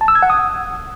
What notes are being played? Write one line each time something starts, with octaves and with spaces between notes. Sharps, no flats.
A5
E6
G#6
F#5
D#6